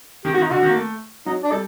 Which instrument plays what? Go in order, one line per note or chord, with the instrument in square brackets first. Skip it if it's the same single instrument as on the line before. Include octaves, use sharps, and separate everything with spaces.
[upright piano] D#3 [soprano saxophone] G4
[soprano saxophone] F#4
[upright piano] D#3
[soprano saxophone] D#4
[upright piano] D3 [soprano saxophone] F#4
[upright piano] D#3
A#3
A3
[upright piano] F#3 [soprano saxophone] D#4
[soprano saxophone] D4
[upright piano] G3 [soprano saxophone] A4